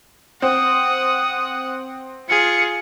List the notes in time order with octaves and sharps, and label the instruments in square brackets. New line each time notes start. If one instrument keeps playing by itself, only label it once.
[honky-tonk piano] C4 [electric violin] F#5 [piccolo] D#6
[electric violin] F4 G#4 [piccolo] C#7